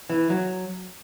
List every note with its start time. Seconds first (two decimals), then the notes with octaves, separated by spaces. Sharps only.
0.10 E3
0.30 F#3